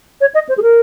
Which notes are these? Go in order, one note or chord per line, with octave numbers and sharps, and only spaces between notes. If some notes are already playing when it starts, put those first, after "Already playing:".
C#5
D#5
C5
G#4
A#4